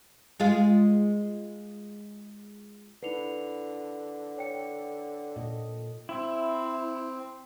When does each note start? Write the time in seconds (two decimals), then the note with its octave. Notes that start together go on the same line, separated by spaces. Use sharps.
0.40 G#3 F4 G#4
3.03 D3 D#4 E4 B4 C7 C#7 F7
4.37 C#5 G5 C#7
5.36 A#2 A4 D#5
6.09 C4 E4